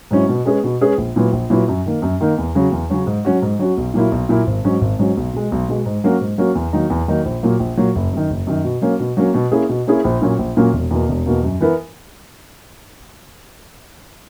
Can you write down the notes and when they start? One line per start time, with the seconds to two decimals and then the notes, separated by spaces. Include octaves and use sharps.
0.11 G#2 F#3 C#4 E4
0.29 B2
0.45 G#3 C#4 G#4 B4
0.64 B2
0.81 G#3 C#4 G#4 B4
0.98 A#1
1.16 A#2 F#3 B3 E4
1.32 A#1
1.50 A#2 F#3 B3 E4
1.68 F#2
1.86 D#3 A#3
2.02 F#2
2.21 D#3 A#3
2.38 E2
2.55 C#3 F#3 C#4
2.72 E2
2.90 C#3 F#3 C#4
3.07 G#2
3.25 F#3 C#4 F#4
3.42 G#2
3.59 F#3 C#4 F#4
3.77 B1
3.94 A#2 F#3 A#3 E4
4.12 B1
4.29 A#2 F#3 A#3 E4
4.47 G#1
4.64 G#2 F#3 C#4
4.81 G#1
4.99 G#2 F#3 C#4
5.17 B1
5.34 B2 G#3
5.52 B1
5.69 B2 G#3
5.86 G#2
6.04 F#3 A#3 C#4 F#4
6.21 G#2
6.38 F#3 A#3 C#4 F#4
6.55 E2
6.73 D#3 F#3 A#3 D#4
6.90 E2
7.08 D#3 F#3 A#3 D#4
7.25 A#1
7.43 A#2 F#3 A#3
7.60 A#1
7.77 A#2 F#3 A#3
7.95 F#1
8.13 F#2 D#3
8.30 F#1
8.47 F#2 D#3
8.64 B2
8.82 F#3 A#3 C#4
9.00 B2
9.17 F#3 A#3 C#4
9.34 B2
9.52 A#3 C#4 E4 G#4
9.69 B2
9.87 A#3 C#4 E4 G#4
10.04 A#1
10.22 A#2 F#3 A#3 C#4
10.39 A#1
10.57 A#2 F#3 A#3 C#4
10.73 E1
10.91 E2 B2 A#3
11.09 E1
11.26 E2 B2 A#3
11.43 F#2
11.60 E3 B3 E4 A#4